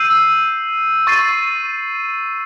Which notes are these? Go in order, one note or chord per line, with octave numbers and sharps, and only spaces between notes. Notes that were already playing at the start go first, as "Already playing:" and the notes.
Already playing: E6 G6 C7 D#7
C#6 E6 A6 C7 D#7